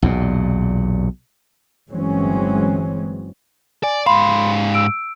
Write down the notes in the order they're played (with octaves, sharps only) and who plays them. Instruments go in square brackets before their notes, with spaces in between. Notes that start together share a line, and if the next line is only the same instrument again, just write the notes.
[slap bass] B1 E2 A#2
[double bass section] G1 E3 F#3 G#3 C4 C#4
[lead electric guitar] D5 [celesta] G#5
[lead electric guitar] G#2 F5 [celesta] B5 C6
[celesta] E6 D7